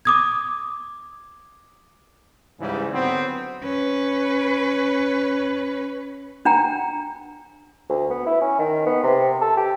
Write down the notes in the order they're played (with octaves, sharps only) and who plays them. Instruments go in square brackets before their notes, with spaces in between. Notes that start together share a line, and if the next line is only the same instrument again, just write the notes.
[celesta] D6 D#6 G#6
[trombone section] C#2 G#2 C#3 E3 G3
D3 F#3 B3 C4
[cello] C#4 B4
[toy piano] D4 F#5 G5 A#5
[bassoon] D2
B3
E4
C#4
D#3
B3
C3
A4
G4